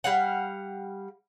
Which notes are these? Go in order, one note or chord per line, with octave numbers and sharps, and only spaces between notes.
G3 F5 F#5